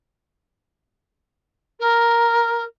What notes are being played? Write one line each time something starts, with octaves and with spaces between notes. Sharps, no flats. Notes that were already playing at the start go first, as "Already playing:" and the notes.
A#4